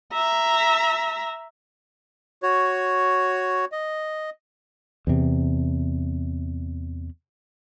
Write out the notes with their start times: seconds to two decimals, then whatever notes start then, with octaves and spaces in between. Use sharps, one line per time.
0.13 E5 A#5
2.43 F#4 C#5
3.72 D#5
5.07 E2 C3